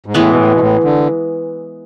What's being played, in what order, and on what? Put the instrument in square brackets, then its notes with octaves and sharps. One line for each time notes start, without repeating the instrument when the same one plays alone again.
[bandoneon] G#2
[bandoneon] A2 [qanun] E3 G#3 B3
[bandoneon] B2
A2
B2
A2
D3